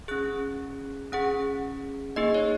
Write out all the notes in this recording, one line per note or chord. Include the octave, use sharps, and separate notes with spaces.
C#4 G#4 F#6
C#4 G#4 F#5
A#3 D#4 G#4 D#5
C#5